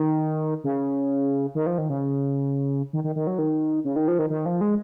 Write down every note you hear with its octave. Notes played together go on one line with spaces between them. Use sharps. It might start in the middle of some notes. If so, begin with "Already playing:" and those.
Already playing: D#3
C#3
D#3
F3
D#3
C#3
D#3
D#3
D#3
F#3
D#3
C#3
D#3
F3
D#3
D#3
F3
G#3